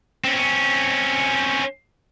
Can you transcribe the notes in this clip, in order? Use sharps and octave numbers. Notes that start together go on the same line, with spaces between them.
C4 C#4